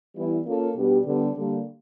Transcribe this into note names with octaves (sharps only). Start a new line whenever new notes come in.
E3 G3 B3 E4
A#3 C#4 F4 A4
B2 G3 B3 D4 G4
D3 G3 B3
D3 G3 A#3